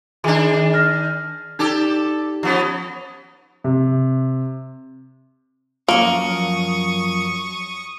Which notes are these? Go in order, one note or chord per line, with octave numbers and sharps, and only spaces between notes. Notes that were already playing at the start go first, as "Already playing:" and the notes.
D#3 D4 G#4 G#5 C6
F6 A#6
D#4 G4 A4 D5
F3 B3 C#4
C3
F#2 F3 F#3 A#3 C#6 D#6